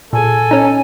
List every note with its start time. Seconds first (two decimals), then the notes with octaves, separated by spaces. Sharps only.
0.13 A#2 G#4 A4 G#5
0.51 C#4 D#4